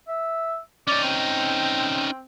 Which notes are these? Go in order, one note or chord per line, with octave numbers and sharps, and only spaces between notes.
E5
C#4 D#4 D5
C4